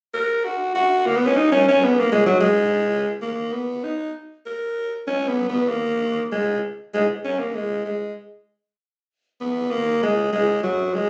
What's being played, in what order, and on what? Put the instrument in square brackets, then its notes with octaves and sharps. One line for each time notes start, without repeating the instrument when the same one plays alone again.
[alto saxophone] A#4
F#4
F#4
A#3
B3
C#4
D#4
C#4
C#4
B3
A#3
G#3
F#3
G#3
A#3
B3
D#4
A#4
C#4
B3
B3
A#3
G#3
G#3
C#4
A#3
G#3
G#3
B3
A#3
G#3
G#3
F#3
G#3